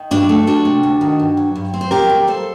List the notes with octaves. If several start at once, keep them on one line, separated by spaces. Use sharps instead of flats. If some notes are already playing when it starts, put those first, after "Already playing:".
Already playing: D#3
G2 D4 F#4
A3
D2 D4 F#4
C3
D2
D#3
G2
F#3
G2
C4
C5
A#2 G4 A#4
G3
A#2 A4 C5